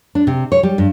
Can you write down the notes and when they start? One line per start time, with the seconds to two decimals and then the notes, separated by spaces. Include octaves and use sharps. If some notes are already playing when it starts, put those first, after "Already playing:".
0.15 D4
0.27 C3
0.52 C#5
0.63 G3
0.78 G2